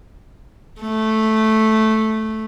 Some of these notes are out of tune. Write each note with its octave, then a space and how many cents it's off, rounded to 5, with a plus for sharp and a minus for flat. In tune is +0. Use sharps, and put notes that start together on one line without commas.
A3 -5